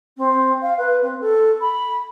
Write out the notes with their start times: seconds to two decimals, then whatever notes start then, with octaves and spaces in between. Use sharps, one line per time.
0.17 C4
0.62 F5
0.77 B4
1.02 C4
1.21 A4
1.60 B5